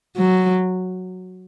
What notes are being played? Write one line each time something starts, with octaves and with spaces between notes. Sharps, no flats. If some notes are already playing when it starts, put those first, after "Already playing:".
F#3